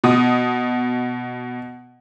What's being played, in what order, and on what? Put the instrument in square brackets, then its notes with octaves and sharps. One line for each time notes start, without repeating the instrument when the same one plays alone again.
[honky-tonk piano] B2 D#6